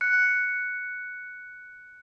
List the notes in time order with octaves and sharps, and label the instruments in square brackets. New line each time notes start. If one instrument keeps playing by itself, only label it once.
[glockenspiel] F#6 C#7